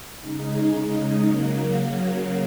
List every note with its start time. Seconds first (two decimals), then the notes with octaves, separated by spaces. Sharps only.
0.20 C#3 G#3 D#4
1.26 C#3 F#3 A#3